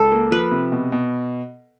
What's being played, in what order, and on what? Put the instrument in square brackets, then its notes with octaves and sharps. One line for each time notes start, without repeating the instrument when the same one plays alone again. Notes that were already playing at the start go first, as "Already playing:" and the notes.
Already playing: [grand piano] C#2 [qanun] A4
[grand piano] A#3
[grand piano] F3 [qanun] B4
[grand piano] C3
B2
B2